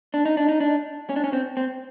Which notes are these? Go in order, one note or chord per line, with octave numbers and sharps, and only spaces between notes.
D4
D#4
D4
D#4
D4
C#4
D4
C#4
C4
C4